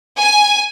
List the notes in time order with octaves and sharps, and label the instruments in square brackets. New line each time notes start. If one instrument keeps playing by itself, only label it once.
[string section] G#5